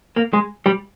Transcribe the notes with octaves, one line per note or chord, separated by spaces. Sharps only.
A#3
G#3
G3